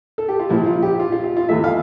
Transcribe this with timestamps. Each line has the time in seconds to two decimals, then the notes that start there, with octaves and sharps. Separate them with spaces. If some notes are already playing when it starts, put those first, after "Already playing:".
0.18 A4
0.28 G4
0.39 F4
0.50 A#1 A#2 F3 E4
0.66 F4
0.82 G4
1.00 F4
1.12 F4
1.24 F4
1.36 F4
1.49 E2 E3 A3 E5
1.64 F5